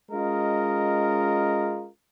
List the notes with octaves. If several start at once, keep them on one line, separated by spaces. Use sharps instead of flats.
G#3 C#4 F4 A#4 D#5